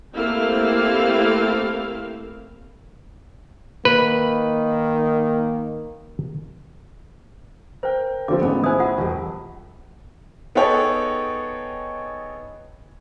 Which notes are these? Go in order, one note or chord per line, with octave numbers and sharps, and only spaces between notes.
A3 A#3 C4 E4 G4 F5
D#3 A#3 B4
A#4 C5 G5
D3 F3 C4 D6
A1 D#3 G#3 B3
E4 C5 G#5 D#6
F4 F#5
E1 G3
B3 D#4 G#4 A4 C#5 G5